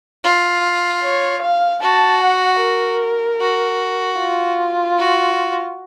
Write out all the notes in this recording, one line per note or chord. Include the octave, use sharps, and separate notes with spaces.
F4
C#5
F5
F#4 A5
F#5
A#4
F#4
F4
F#4